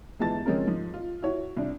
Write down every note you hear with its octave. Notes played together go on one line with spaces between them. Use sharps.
G1 E3 G#3 A5 A6
C#3 F3 G#3 C4 C#4 A#4
G#2 F3
F4
E4 F#4 C#5
C2 D4